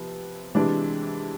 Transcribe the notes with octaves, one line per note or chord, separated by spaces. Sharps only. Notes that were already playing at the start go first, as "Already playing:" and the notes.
Already playing: C3 F3 B3
C3 E3 G#3 D4